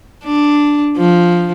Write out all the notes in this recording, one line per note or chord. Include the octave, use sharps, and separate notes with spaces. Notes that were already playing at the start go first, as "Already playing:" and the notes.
D4
F3